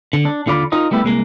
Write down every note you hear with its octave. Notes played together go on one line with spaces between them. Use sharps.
D3
D4
D#2 D3 F4 D5 B5
D#4 F4 A#4 D#5
G3 A3 B3 E4 G4
C2 G#3 A#3